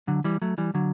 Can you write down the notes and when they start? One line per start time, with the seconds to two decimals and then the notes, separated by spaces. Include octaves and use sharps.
0.08 D3 F#3
0.24 E3 G3
0.42 F#3 A3
0.58 E3 G3
0.75 D3 F#3